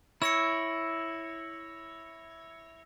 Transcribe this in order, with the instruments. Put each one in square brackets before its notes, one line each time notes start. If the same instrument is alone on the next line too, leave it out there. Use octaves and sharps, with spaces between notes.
[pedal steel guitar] E4 C#5 [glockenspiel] E6 A#6 C#7